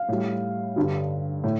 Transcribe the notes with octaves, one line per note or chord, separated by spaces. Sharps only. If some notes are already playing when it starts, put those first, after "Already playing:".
Already playing: F5
A2 G3
G2 D3 G3
A2